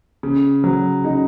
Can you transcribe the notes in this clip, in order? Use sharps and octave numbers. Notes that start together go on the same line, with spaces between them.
C#3
F#3
C#3 D#4